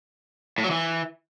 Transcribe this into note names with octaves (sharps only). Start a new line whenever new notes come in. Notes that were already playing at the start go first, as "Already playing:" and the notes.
A2
F#3
E3